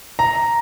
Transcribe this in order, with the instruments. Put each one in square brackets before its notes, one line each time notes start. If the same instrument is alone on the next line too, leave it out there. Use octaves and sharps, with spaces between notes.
[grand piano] A#5